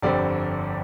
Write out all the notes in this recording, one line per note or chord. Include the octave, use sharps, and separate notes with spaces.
G1 F2 D3 G3 C4 D5